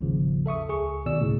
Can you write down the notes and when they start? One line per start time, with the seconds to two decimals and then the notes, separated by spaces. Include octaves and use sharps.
0.01 G#1 D#2 C#3 F3
0.46 A4 E5 C#6 D#6
0.69 C#2 G#4 C#6
1.06 B2 D#3 G#4 D5 E6
1.21 D2 A2 C#3